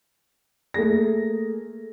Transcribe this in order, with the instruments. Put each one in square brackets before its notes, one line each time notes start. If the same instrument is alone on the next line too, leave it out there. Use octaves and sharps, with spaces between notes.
[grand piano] A3 A#3 G#4 A#6